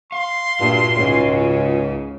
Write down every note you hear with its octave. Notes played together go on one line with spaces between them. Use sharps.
F5 C6
G2 A#2 F4 F#4 E5
C#2 G#2 C#3